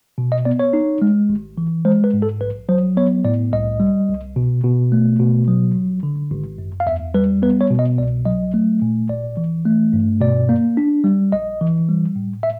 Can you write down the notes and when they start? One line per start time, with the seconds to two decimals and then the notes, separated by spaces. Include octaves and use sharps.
0.18 B2
0.32 D#5
0.45 B3 D5
0.59 C#5
0.73 D#4
1.02 G#3
1.29 G#1
1.58 E3
1.85 G#3 C5
2.04 B4
2.13 G#2
2.22 A4
2.41 A#1 B4
2.69 F#3 C5
2.97 B3 C#5
3.25 A2 D5
3.52 C2 D#5
3.80 G3
4.08 C2
4.36 B2
4.64 B2
4.92 A3
5.19 B2
5.48 F#3
5.75 G#1
6.03 D3
6.32 G#1
6.58 F#2
6.80 F5
6.86 E2 E5
7.14 G3 B4
7.42 B3 B4
7.61 C#5
7.70 B2
7.79 D#5
7.98 C2 D5
8.25 F#3 D#5
8.54 A3
8.82 A#2
9.09 G#1 D5
9.37 E3
9.65 A3
9.93 G2
10.21 B2 D5
10.49 A#3
10.77 D4
11.04 G3
11.32 A#1 D#5
11.61 E3
11.89 G3
12.16 A2
12.43 E5